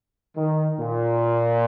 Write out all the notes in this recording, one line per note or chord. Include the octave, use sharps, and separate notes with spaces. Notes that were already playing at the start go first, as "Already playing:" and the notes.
D#3
A#2